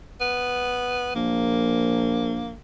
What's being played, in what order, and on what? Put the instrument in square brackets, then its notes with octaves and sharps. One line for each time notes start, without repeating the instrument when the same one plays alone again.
[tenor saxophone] B3
[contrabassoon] A#1 [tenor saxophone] A#3